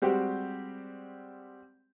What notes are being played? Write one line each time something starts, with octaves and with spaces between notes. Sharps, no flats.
G3 G#3 C4 F#4 G4